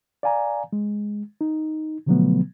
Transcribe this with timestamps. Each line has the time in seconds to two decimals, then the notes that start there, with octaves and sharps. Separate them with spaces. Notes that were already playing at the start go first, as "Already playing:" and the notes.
0.23 D5 F5 G#5 A#5
0.73 G#3
1.41 D#4
2.06 B2 D3 F3 F#3 A3 B3